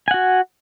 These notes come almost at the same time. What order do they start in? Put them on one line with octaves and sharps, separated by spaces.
G#5 F#5 F#4